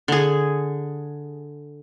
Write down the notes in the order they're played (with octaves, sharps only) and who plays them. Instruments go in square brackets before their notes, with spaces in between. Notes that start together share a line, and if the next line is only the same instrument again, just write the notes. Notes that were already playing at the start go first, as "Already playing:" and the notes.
[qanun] D3 G#4